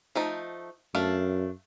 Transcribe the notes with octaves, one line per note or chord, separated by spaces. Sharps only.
F3 A3 D#4
F#2 A3 D4 F5